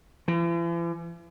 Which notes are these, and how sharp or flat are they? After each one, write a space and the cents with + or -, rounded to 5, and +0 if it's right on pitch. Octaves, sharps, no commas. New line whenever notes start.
E3 +45